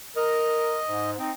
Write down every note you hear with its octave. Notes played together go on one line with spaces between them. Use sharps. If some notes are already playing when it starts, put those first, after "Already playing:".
A#4 D#5
G#2
C4 D#4